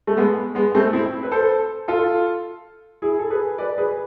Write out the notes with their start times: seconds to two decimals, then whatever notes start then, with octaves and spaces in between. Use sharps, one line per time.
0.07 A3
0.17 G#3 B3
0.55 G#3 B3
0.75 A3 C4
0.93 C4 E4
1.23 B4
1.32 A4 C5
1.88 F4 A4
3.02 E4 G#4
3.19 A4
3.30 G#4 B4
3.58 B4 D5
3.78 G#4 B4